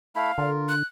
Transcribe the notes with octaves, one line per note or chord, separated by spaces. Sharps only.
A3 E4 F5 B5
D3 F4 A#4
F#6